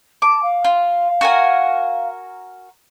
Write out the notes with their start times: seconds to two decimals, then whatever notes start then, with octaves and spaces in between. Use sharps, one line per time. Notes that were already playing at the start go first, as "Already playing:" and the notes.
0.22 A5 D6
0.42 F5
0.64 F4
1.21 F#4 A#4 G#5